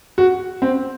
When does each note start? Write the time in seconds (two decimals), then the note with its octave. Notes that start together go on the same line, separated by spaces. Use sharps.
0.18 F#4
0.62 C4